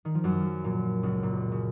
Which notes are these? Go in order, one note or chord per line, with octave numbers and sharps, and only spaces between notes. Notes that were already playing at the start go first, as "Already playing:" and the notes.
D#3
F3
F#2 F#3
A#2
C#2 C#3
A#2
C#3